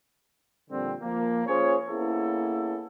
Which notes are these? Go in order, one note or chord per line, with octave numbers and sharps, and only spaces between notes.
A#2 D3 F3 G3 C4
F3 A#3
C#4 F4 G#4 C5 C#5
A#3 B3 C#4 E4 G#4 A4